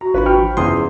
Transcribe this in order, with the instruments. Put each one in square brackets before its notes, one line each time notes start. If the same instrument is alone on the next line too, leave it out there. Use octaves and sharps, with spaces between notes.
[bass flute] F#4 [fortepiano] A#5
[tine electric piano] G#1 D4 B5 [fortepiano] F4 B4
[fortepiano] G5 C#6 F6
[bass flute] F3
[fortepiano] E2 C#3 [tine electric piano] C6 D#6
[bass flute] F3